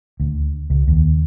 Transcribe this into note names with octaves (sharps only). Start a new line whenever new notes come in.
D2
C#2
D#2